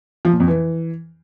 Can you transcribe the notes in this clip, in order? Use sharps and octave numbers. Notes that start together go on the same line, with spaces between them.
F3
A#2
F2
E3